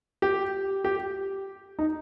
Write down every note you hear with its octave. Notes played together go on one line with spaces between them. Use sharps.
G4
G4
D#4